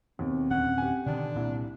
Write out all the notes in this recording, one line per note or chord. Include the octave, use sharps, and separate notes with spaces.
D#2 B2 C4
D1 C#4 F#5
G4 G#5
B2 D3 D#3 D4
C2 A#2